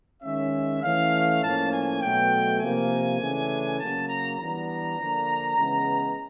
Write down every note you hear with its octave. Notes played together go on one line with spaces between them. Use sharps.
D#3 G#3 C#4 E5
E3 A3 C#4 F5
A2 F3 A#3 C#4 A5
G#5
B2 F#3 A3 G5
C3 F3 A#3 G#5
C#3 E3 A3 D4
C#3 F#3 A#3 A5
A#5
E3 G3 B3 D4 A#5
D3 F3 A#3 D4
C#3 E3 G#3 B3